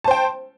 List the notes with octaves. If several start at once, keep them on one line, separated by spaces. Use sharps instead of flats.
C5 G5 A5